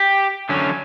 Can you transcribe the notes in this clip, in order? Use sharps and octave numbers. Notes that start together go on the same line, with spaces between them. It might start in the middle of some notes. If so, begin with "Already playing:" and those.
Already playing: G4
D3 F#3 C#4